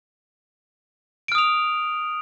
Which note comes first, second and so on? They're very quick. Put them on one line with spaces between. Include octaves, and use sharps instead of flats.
D7 F6 D#6 F7